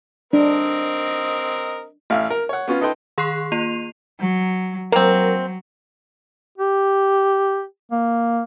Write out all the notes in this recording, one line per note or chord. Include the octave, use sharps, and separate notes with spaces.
C4 D4 A#4 D#5
A1 E5 F5
A#4
C#5 F#5
B3 C#4 F4
D#4 A4 B4 D#5 G5 C6
D#3 G#4 C6 C#6 F#6 C7
A#3 F4 C7 D#7 F7
F#3
F#3 A#3 C4 A#4
G4
A#3